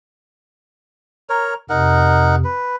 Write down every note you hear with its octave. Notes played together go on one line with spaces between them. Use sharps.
A#4 C#5 A#5
F2 C3 D#4 A#4 F#5
B4